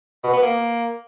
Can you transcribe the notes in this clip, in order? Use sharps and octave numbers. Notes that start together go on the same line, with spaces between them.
B2
B3
A#3